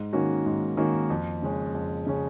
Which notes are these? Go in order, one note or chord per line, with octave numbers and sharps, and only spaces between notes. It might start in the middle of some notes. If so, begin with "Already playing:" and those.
Already playing: G#2
D#3 A#3 C#4 F#4
G#2
D#3 A#3 C#4 F#4
F2
C#3 G#3 C#4
F2
C#3 G#3 C#4